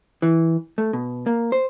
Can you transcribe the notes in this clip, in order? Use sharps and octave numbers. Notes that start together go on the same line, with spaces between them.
E3
A3
B2
A#3
C5